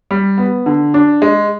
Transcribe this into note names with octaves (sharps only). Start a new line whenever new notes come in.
G3
B3
D3
D4
G#3